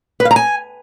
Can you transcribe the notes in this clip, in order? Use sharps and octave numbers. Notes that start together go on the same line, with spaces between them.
B4
F5
A#5
G#5